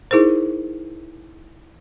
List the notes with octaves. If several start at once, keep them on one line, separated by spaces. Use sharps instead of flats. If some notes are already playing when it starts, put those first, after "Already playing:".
D#4 E4 G#4 A#4 C5